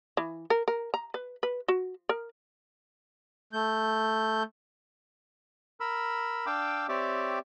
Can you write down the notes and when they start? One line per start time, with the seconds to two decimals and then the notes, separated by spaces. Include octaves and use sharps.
0.17 E3
0.50 A#4
0.68 A#4
0.94 A#5
1.14 B4
1.43 B4
1.68 F#4
2.09 A#4
3.53 A3 G6
5.80 A#4 B5 E6
6.46 D4 F5 G5 D6 E6
6.89 C4 G4 C#5 D5 E5 D6